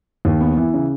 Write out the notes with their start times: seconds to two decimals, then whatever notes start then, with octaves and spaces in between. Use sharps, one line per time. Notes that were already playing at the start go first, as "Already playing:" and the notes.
0.25 D#2
0.41 B3
0.57 E3
0.74 C#3